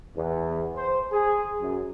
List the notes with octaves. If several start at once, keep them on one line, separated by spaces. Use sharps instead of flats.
E2
C5
G#4
F#2